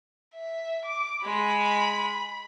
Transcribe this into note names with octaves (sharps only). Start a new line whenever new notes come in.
E5
D6
G#3 B5